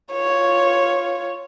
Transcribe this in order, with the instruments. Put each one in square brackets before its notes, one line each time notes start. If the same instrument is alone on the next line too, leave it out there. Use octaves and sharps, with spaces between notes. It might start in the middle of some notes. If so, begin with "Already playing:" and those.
[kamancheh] F4 C#5